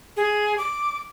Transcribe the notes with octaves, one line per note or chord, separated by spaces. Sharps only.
G#4
D6